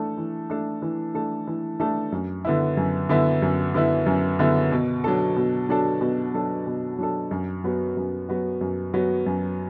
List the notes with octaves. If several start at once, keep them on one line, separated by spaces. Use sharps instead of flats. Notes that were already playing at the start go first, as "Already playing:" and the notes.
Already playing: E3 A3 D4 A4
E3
A3 D4 A4
E3
A3 D4 A4
E3
A3 D4 A4
F#2
D3 B3 E4
F#2
D3 B3 E4
F#2
D3 B3 E4
F#2
D3 B3 E4
B2
F#3 D4 A4
B2
F#3 D4 A4
B2
F#3 D4 A4
B2
F#3 D4 A4
F#2
F#3 B3 F#4
F#2
F#3 B3 F#4
F#2
F#3 B3 F#4
F#2